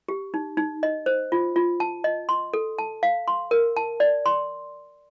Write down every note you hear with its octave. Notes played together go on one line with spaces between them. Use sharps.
G4
D#4
D#4
D#5
C5
F4
F4
A5
D#5
C6
A4
A5
F5
C6
A#4
A5
D5
C6